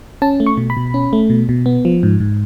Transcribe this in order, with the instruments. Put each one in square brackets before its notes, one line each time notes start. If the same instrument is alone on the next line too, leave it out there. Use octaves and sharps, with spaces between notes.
[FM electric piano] C#4 A5
A3
C#6
B2
B5
B2
C#4
A3
B2
B2
B3
F3
G#2
G#2